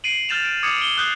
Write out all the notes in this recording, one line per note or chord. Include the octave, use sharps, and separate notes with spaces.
C7 D7 D#7 F#7
F6 G6 A6 E7 F7
D7
D6 D#6 G#6 C#7
D7 G7
D#6 F#6 G6 C7